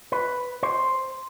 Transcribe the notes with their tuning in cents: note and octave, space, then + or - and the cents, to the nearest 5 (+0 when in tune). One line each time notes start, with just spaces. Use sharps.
B4 +5
C5 +5